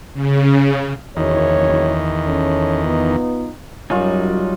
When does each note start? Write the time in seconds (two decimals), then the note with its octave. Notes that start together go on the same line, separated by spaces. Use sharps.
0.14 C#3
1.17 F#1 E2 A2 D#3 C#5
2.27 C#4 A4 C#5
2.85 B3 D#4 F4
3.90 F#2 F#3 G3 C#4 D#4 F4